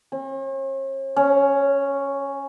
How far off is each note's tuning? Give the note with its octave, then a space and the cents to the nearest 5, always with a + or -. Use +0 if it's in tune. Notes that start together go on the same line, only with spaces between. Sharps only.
C#4 -45
C#4 +0